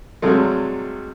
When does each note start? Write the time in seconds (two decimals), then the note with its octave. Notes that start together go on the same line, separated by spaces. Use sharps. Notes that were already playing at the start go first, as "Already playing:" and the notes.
0.22 G2 C3 F#3 G#3 A3